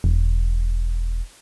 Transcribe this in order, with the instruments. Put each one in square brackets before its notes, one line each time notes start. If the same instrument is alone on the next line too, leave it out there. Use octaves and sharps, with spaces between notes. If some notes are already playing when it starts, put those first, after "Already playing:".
[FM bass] E1